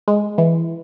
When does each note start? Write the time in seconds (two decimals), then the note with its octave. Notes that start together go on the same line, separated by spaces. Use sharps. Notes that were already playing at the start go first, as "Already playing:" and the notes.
0.08 G#3
0.38 E3